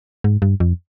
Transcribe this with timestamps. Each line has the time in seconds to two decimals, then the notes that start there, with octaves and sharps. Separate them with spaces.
0.24 G#2
0.42 G2
0.60 F2